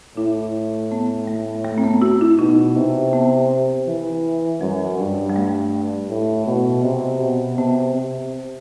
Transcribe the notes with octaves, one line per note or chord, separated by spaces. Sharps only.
A2 E4
B3
A3
A3
C4
B3
F#4
E4
B2 D#4
C3
B3
E3
F#2 G3
G2
G3
A3
A2
B2
C3
B2
C3 B3
C3